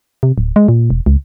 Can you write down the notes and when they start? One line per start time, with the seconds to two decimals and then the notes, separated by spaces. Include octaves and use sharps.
0.23 C3
0.38 D1
0.56 G#3
0.68 A#2
0.90 E1
1.06 C#2